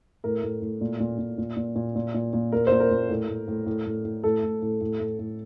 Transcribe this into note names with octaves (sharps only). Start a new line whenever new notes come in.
A2 A#4
A2
A2
A#2
A#2
A#2
A#2
A#2
A#2
A#2
A#2
A#2
A#2 A#4
A#2 C5
A#4
A#2
A2
A2
A2
A2
A2
A2
A2 A4
A2
A2
A2
A2
A2